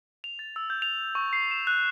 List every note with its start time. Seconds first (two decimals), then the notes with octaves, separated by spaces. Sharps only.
0.24 F7
0.39 A6
0.56 E6
0.70 G6
0.82 F7
1.15 C#6
1.33 C7
1.51 E7
1.67 F#6